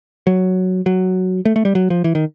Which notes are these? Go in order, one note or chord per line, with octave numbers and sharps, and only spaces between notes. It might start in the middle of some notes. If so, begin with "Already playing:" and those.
F#3
F#3
A3
A3
G3
F#3
F3
E3
D#3